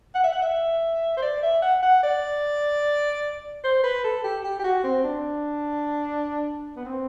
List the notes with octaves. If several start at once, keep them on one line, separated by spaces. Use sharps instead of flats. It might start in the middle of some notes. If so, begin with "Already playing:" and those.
F#5
E5
F#5
E5
C5
D5
E5
F#5
F#5
D5
C5
B4
A4
G4
G4
G4
F#4
C4
D4
B3
C4